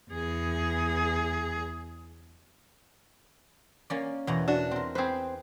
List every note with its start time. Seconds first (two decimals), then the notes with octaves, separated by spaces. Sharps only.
0.11 E2 G#4
3.90 A#3 C#4 D5
4.27 E2 B2 A#5
4.48 D4 F#4
4.71 C4 A#4
4.95 C4 G#4 B4 C5